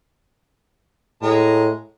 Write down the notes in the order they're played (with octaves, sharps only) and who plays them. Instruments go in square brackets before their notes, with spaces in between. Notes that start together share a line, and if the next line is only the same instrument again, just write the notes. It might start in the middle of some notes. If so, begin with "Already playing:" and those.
[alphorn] A2 [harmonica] G#3 A#5